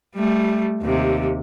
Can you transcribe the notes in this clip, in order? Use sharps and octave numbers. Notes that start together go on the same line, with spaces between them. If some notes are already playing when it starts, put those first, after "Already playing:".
G3 A3
D#2 C3